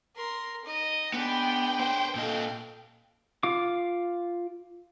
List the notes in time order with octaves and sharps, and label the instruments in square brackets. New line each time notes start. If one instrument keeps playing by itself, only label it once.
[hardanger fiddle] A#4 C6
D#4 D#5
[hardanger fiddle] G#3 D4 [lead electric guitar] B3 [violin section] G5
[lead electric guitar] B4 C5
[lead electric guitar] A#2 D#5 [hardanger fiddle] A4 F5
[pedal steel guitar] F4 F5 D6